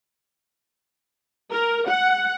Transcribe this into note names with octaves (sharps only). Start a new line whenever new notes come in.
A#4
F#5